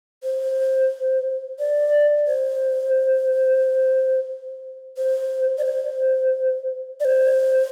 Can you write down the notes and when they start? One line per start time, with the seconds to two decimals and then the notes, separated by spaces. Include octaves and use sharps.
0.23 C5
1.59 D5
2.27 C5
4.97 C5
5.58 D5
5.65 C5
7.00 D5
7.05 C5